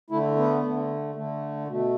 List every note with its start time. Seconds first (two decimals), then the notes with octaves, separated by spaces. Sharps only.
0.10 D3 A3 E4
0.36 B3
0.63 D3 A3
1.15 D3 A3
1.68 B2 A3